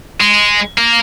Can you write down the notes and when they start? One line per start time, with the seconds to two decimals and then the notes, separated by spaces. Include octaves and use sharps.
0.21 G#3
0.78 A#3